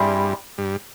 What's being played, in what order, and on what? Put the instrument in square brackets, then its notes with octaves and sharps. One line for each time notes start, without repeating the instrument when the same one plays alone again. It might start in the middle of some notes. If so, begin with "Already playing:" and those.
Already playing: [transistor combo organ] G2 [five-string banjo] G3 C4 E4 G#4
[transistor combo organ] G2